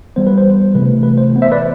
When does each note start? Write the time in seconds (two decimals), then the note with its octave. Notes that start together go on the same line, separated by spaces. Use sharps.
0.16 E3 G3 B3 C5
0.27 B4
0.38 C5
0.75 C3 E3 A3 B4
1.03 B4
1.18 C5
1.32 E3 B3
1.42 C5 E5
1.52 B4 D5